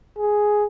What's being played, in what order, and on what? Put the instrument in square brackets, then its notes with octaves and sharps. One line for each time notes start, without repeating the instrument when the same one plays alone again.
[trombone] G#4